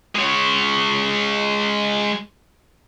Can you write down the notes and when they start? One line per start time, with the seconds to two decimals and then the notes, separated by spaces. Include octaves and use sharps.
0.16 G#3 C#5